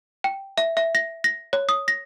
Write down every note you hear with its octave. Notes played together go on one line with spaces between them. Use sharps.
G5
E5
E5
A#6
A#6
C#5
D#6
A#6